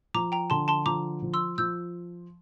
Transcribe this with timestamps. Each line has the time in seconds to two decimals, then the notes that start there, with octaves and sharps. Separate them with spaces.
0.14 F3 A#5 D6
0.32 G5 A#5
0.50 D3 A5 C6
0.68 A5 C6
0.86 F3 A#5 D6
1.22 F3
1.34 C6 E6
1.58 F3 E6 G6